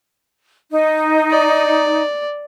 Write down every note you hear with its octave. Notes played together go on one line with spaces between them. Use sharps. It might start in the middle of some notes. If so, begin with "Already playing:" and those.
D#4
D5